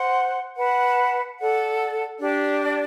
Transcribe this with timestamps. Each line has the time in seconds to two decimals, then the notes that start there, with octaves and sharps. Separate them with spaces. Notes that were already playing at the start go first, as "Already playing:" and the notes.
Already playing: C5 F#5 C6
0.56 B4 F#5 A5
1.38 A4 D5 F#5
2.20 D4 G4 D5